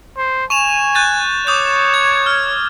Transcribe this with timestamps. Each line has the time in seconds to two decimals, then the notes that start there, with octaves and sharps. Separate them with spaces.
0.17 C5
0.50 G#5 C#6 E7 F7
0.95 F#6 G6 A6
1.47 C#5 D6 D#6 G6
1.94 G#6
2.26 F6